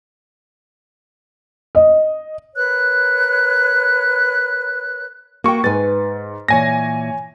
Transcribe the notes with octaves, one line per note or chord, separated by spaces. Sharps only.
D#5
A#4 B4 C#5 F#6
A#3 F#4 G5 C#6
G#2 B4 G#5 A6
A#2 E3 C#5 G#5 A#6